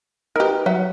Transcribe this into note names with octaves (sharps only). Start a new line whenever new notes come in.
D#4 G4 A#4 B4
F#3 B4 E5 F#5